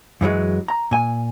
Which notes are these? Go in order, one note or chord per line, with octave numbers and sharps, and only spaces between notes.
F#2 E3 F#3 G#3
A#5
A#2 G#5